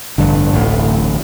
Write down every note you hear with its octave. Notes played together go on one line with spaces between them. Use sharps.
A1 G2 D3
D1 A1